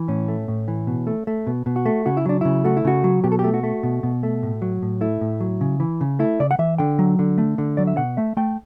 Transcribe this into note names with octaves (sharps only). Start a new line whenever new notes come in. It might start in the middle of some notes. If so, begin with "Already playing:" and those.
Already playing: E3
A2 C#4
A3
A2
E3
B2
A3
A3
B2
B2
F#4
A3
C#3 F#4
E4
F#3 D4
C#3 E4
A3 F#4
E4
C#3 F#4
F#3
B2 G4
A4
G4
A3
F#4
A3
B2
B2
A3
A2
F#3
A2
A3 E4
A2
F#3
C#3
E3
C#3
A3 E4
C#3 D5
F#5
E3 E5
D3 G5
F#3
D3
A3
D3
F#3 D5
E5
B2 F#5
A3 E5
A3 G5